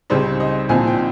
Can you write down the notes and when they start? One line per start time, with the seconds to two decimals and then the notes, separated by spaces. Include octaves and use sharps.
0.10 C#2 C#3 G3 C4 D#4 C5
0.40 D#5
0.69 C2 A#2 F3 C4 D#4 G#5
0.87 G5